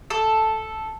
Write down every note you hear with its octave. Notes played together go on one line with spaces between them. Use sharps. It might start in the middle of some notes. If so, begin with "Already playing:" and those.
A4